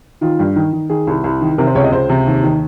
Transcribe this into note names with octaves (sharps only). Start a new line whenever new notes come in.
D#3 F4
G2
D#3
D#3
D#3 G#4
C2
C2
D#3
C3 A#4
C5
C#2 C#5
D#5
C#2 C5
C3
D#2
D#3